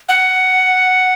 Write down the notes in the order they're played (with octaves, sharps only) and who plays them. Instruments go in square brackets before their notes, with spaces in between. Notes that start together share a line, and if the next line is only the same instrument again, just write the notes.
[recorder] F#5